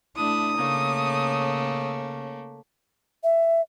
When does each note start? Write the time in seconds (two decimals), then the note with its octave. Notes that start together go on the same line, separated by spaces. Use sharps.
0.16 A3 D4 E4 D#6
0.57 C#3 A3 A#3 C#4
3.23 E5